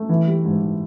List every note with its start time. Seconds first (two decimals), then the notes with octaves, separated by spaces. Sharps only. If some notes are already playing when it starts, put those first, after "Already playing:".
Already playing: A3
0.09 E3
0.27 G3
0.45 G#2
0.62 E3